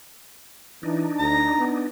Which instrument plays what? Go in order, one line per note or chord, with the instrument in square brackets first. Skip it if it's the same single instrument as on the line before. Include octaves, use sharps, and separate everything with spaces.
[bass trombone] E3 [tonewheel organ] D4 D#4
[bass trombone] D2 [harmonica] A#5
[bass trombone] B3